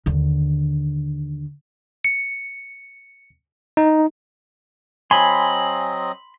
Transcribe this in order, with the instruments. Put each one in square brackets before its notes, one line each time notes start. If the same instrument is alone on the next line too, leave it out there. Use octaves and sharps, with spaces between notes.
[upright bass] D#2 D3
[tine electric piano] C#7
D#4
[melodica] F#3 C4 D#5 [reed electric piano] G#5 [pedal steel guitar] B5 C6